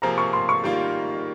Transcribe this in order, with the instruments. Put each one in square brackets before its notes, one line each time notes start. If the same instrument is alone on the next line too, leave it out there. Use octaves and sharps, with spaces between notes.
[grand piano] C3 F3 A#3 F4 G#4 [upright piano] A#5
[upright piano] C#6
C6
C#6
[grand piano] D#3 G3 A#3 F4